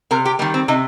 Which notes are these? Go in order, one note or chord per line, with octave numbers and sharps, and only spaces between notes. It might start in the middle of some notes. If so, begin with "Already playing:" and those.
C3 A#4
G4
D#3 G3 A#3
C4
C3 D#4